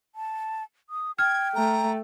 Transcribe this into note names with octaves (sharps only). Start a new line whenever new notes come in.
A5
D#6
G5 F6 G#6
A3 A#5